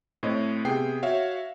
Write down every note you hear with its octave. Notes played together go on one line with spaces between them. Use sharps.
A2 C4 C#5 D#5
C3 B3 G#4 G5 C7
F#4 C#5 E5 F5